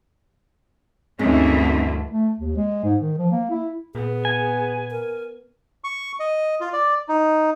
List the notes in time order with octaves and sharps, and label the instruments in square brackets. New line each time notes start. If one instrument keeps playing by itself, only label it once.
[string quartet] D2 [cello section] G2 D#3 E3 [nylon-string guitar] G#3 [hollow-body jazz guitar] C4 C#4 D#4
[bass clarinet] A3
D#2
G#3
G#2
D#3
F3
A#3
E4
[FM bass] A#2 [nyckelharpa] B3 [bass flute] G#4
[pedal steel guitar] G#5
[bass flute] A#4
[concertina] C#6
D#5
F4
D5
D#4